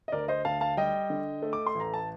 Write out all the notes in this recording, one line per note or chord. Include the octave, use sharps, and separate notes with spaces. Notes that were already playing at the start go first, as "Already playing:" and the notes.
D#5
D2 A#4 D5
C5 D#5
D2 F5 A5
F5 A5
G3 D#5 G5
D3
A3
D6
C6
A1
A#5
A5